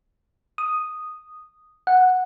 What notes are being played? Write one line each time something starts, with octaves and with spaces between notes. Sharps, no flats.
D#6
F#5